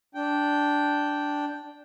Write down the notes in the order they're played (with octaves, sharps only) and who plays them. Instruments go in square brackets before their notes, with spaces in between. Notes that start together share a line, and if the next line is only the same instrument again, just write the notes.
[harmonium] D4 G5